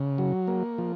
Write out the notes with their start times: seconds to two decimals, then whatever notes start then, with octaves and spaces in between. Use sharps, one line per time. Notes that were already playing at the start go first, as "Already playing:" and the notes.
Already playing: C#3
0.18 F#3
0.47 A#3
0.78 F3